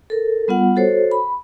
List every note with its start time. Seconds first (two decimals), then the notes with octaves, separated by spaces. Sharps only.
0.10 A4 A#4
0.48 G3 B3 F4 F#5
0.76 F#4 A4 C5 C#5
1.12 B5